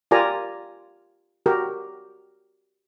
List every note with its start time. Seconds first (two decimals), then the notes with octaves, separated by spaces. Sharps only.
0.11 F4 G4 A#4 D5 G#5 A#5
1.46 F#4 G4 A#4